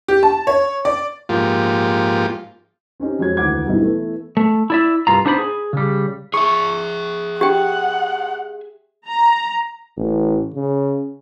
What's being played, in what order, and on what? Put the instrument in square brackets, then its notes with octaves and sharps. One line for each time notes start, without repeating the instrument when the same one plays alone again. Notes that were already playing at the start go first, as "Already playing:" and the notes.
[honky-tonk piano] G4
A5
C#5
D5
[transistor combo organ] G#2 F3 A#3 F4 G4
[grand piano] C4 C#4 D#4 G4
F2 F#3 G#3 F#4 C#5 G#6
D2 D#3 E3 F#5 D6 G#6
G2 B2 C4 D#4 E4
E3 A3 B3 E4
[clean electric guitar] A3
E4 D5 E5
C2 G2 F4 A#5
B3 D4 D#4 C5 F#5 B5
G#4
C#3 G3
[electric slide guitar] G#4 E5 [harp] C#6
[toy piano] G4 G5 [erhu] F#5
[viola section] A#5
[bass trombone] A1
C#3